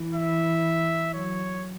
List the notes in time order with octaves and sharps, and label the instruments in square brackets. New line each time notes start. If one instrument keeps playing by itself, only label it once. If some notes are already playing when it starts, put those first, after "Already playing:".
Already playing: [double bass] E3
[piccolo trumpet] E5
[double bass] F#3 [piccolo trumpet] C#5